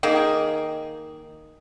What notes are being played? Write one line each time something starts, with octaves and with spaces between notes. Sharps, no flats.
D#3 A#3 G#4